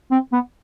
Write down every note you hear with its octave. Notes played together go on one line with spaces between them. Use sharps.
C4
B3